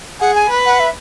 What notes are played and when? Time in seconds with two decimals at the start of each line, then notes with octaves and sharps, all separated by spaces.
0.21 G#4 F#5
0.35 G#5
0.50 B4
0.66 F#5
0.80 E5